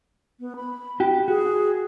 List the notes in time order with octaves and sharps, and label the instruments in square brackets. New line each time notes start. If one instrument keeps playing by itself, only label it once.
[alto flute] B3
B5
[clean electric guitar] F#4 G4
[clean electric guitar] F#4 [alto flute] G#4